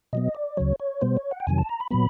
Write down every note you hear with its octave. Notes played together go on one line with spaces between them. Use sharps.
B2 F#3 B3 D#5
D5
D2 C#3 F#3 C#5
C#5
B2 G3 B3 C5
C#5
F#5
G5
F2 C3 D#3 F#3 G#5
A5
A#5
B5
A#2 F#3 B3 B5